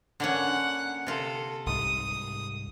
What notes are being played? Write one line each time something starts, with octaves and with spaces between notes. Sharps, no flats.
D3 A#3 C#4 F#5
C3 F4 A4
C2 G#2 D#6